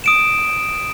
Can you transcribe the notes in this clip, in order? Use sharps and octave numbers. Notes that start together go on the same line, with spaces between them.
D#6 D7 E7